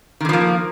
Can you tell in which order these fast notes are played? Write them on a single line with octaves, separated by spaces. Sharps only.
D#3 D3 F3 A#3